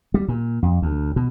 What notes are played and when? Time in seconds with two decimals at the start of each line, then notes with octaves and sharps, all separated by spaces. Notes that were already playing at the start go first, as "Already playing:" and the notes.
0.14 G3
0.28 A#2
0.63 F2
0.82 D2
1.16 B2